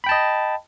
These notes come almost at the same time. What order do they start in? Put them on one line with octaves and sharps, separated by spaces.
B5 G5 A5 D#5